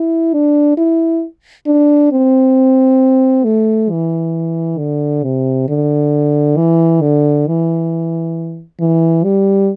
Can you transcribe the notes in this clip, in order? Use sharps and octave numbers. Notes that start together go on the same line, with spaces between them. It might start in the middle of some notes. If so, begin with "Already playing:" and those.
Already playing: E4
D4
E4
D4
C4
A3
E3
D3
C3
D3
E3
D3
E3
E3
G3